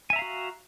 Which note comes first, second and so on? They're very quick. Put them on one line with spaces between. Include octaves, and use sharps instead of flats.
G#5 E5 A#5 F5 F#4